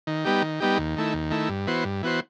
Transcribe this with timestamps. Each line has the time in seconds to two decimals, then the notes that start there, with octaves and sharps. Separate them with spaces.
0.07 D#3
0.25 G3 B3 D#4 G4
0.42 D#3
0.60 G3 B3 D#4 G4
0.78 D#2
0.96 D#3 A3 E4
1.14 D#2
1.31 D#3 A3 E4
1.49 G2
1.67 E3 B3 F#4 C5
1.84 G2
2.03 E3 B3 F#4 C5